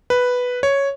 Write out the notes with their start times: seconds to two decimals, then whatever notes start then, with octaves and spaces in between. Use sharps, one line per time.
0.10 B4
0.63 C#5